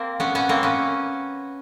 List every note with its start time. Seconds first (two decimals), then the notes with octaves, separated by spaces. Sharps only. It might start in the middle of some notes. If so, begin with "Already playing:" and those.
Already playing: A#3 C4
0.20 B3 C#4
0.35 B3 C#4
0.49 A#3 C4
0.63 B3 C#4